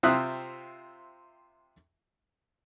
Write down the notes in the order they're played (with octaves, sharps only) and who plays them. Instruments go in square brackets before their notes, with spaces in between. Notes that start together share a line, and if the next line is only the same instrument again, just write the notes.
[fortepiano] C3 C4 F4 E5 D#6 F#6